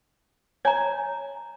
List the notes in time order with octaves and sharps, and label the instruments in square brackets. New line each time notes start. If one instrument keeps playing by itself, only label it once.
[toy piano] C#5 A#5 [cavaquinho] G#5